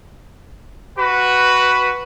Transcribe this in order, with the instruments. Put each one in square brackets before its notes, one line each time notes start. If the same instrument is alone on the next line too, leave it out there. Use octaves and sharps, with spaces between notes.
[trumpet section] F#4 B4